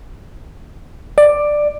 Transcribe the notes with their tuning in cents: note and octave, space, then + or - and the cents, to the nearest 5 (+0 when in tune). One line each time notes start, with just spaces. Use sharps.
D5 +10